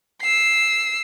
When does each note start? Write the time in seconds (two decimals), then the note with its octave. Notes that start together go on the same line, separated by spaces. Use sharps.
0.22 E6 C7